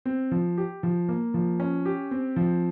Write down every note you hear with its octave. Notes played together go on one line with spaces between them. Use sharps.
C4
F3
G4
F3
A#3
F3
C#4
G4
C4
F3